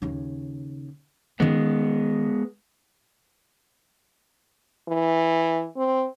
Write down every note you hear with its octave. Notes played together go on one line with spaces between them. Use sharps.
D#2 C#3
D#3 G#3 B3 C#4
E3
C4